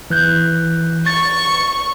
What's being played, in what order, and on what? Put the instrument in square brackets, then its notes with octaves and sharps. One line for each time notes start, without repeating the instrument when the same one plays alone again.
[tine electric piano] E3 F#6 G6
[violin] C#6 [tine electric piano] A6